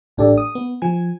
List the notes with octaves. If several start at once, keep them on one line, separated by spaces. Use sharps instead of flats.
A1 A2 D4 G4 A4 D5
D#6
B3
F3 G#5 G#6